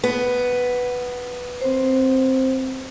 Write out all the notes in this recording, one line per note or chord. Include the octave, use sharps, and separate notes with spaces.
B3
C4 C5